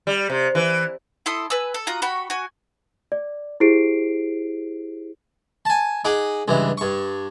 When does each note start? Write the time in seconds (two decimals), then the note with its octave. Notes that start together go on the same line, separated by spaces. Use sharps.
0.07 G3
0.30 C3
0.55 E3
1.26 E4 A4 C6 D#6
1.50 B4 G#5 E6
1.74 A4
1.87 F4 F#4 A#5 D#6
2.02 F#4 G4 B5 C#6
2.30 F#4 G#5
3.12 D5
3.60 E4 G4 G#4 C5 C7 D7
5.65 G#5 A5
6.05 D#4 G#4 F#5 D6
6.48 C#2 G2 E3
6.78 G2 C#6